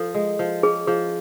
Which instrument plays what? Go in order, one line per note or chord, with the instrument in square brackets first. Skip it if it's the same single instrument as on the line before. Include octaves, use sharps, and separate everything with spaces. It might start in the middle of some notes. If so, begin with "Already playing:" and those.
Already playing: [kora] F3 [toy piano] A4
[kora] G#3
F3
[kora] C#4 [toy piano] G#4
[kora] F3 [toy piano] G#4